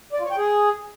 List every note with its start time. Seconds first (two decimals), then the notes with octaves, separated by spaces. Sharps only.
0.13 D5
0.19 F4
0.25 C#5
0.31 G5
0.37 G#4